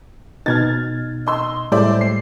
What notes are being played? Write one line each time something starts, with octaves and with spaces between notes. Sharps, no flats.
B2 D#4 F6 G#6 A6
D#5 C6 E6
A2 G3 G#3 C5 D5 E5
C7